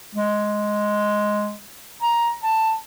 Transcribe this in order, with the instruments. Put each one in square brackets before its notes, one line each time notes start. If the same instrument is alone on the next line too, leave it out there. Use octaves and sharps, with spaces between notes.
[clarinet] G#3
A#5
A5